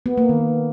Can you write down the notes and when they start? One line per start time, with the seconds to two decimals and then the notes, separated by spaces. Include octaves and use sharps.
0.06 B3
0.18 A#3
0.29 D#3